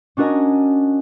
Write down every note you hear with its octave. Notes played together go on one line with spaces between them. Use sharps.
C#4 D4 F#4 A#4 D#5 G#5